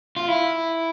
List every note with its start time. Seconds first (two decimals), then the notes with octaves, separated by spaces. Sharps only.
0.16 F4
0.28 E4